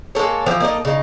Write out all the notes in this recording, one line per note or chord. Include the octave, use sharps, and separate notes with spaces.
G#3 A#3 A4 C#5
E3 F3
A#3 D#4 A4 D#5
C#3 D#4